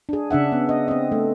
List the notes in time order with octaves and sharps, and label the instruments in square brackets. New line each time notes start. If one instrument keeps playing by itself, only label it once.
[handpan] D4 G#4
C#3 D4 E5 F#5
B3
D#5
C4 D#5
A3